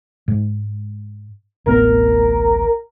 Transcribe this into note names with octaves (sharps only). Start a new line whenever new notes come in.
G#2
D1 A1 B3 A#4